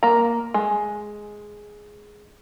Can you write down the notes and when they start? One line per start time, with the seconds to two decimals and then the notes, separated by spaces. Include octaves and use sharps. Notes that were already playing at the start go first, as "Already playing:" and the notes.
0.03 A#3 A#5
0.54 G#3